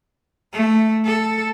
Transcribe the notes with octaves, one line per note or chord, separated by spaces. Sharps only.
A3
A4